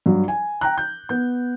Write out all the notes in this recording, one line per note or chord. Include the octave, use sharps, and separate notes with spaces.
G2 F#3
G#5
G5 A#5 F#6
G6
B3 G6